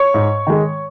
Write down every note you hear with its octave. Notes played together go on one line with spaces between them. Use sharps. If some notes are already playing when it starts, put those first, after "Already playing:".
Already playing: C#5 C#6
G#2
D#3 G#3